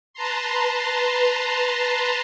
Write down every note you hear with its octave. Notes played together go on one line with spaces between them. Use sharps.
B4 A5 A#5 C6